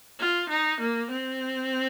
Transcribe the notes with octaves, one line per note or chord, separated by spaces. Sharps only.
F4
D#4
A#3
C4